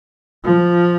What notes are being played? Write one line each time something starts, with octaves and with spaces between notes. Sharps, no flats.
F3